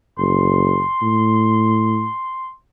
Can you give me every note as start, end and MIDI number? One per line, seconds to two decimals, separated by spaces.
0.18 0.83 30
0.18 2.52 84
1.02 2.07 45